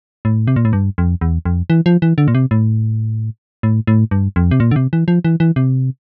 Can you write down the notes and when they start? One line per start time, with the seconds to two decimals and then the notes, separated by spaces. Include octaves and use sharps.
0.25 A2
0.48 C3
0.56 A#2
0.65 A2
0.73 G2
0.98 F2
1.21 E2
1.45 F2
1.70 E3
1.86 F3
2.02 E3
2.18 D3
2.28 A#2
2.35 C3
2.51 A2
3.63 A2
3.87 A2
4.11 G2
4.36 F2
4.51 C3
4.60 A#2
4.71 D3
4.76 C3
4.93 E3
5.08 F3
5.25 E3
5.40 E3
5.56 C3